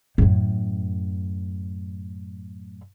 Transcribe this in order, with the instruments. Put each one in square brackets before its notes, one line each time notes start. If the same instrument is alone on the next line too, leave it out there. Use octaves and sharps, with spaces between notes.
[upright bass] F#2 A2